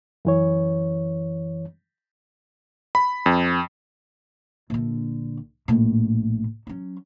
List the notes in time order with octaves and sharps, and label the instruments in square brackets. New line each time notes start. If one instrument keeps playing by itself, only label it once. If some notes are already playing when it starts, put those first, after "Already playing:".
[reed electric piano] F#2 E3 C#5
[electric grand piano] B5
F2
[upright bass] A#1 D3
A#1 A2
F#3 C#4